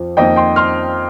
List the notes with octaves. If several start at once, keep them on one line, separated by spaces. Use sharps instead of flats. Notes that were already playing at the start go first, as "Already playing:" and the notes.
Already playing: F2 F3
F2 F3 A#3 D#4 D#5 G5
G5 C6
C6 F6